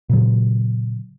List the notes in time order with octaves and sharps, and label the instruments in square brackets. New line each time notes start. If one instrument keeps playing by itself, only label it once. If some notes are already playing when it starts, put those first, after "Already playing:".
[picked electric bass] A#2 C#3 F#3